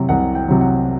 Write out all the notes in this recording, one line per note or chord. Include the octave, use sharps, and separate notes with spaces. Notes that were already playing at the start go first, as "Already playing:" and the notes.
Already playing: C3 F#3
C2 F#5
G5
C3 F#3
F#5